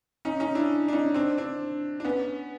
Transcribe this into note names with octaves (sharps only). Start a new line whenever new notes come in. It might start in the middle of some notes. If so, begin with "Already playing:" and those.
C#4 D#4
C#4 D#4
D4 E4
D4
C#4 D#4
C4 D4
C4 D4
D4
B3 C#4